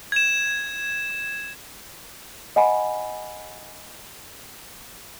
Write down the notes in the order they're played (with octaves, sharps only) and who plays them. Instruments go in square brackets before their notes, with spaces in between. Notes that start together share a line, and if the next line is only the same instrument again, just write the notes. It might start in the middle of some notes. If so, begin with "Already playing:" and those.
[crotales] G#6 E7
[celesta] D#5 F#5 G#5 B5